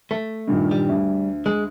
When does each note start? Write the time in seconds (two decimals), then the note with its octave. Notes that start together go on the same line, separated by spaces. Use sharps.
0.11 A3
0.48 G2 A#2 D#3
0.71 G3
0.89 D2
1.46 G#3